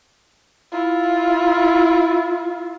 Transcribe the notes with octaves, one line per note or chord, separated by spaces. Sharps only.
E4 F4